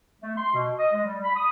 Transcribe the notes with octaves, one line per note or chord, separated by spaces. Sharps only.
A3
C6
B2
D#5
G#3
G3
B5
D#6